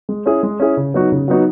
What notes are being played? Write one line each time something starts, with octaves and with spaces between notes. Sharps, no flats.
G#3
C#4 E4 G#4
G#3
C#4 E4 G#4
C#3
F#3 B3 D#4 F#4
C#3
F#3 B3 D#4 F#4